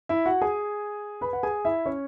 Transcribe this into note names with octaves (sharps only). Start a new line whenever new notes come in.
E4 E5
F#4 F#5
G#4 G#5
B4 B5
F#5
G#4 G#5
E4 E5
C#4 C#5